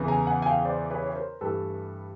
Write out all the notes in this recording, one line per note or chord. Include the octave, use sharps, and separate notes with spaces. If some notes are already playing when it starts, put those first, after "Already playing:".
Already playing: E2 C#3 E3
G#5 A#5
F#5 G#5
G#5
F5 G5
C5 D5
B4 C#5
C#5
A#4 C5
G2 E3 A3 A4 B4